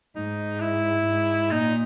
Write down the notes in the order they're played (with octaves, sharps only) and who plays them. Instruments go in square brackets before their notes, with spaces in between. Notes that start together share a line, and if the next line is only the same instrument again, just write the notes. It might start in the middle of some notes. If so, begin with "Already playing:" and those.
[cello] G#2 [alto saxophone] D#4
[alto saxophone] E4
[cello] G#2
[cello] A#2 [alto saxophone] D#4